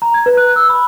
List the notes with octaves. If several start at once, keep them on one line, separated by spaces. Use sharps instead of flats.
A#5
G#6
B4
F#6
E6
B5